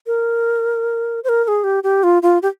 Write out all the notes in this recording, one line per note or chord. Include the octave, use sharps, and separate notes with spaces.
A#4
C5
A#4
A#4
G#4
G4
G4
F4
F4
G4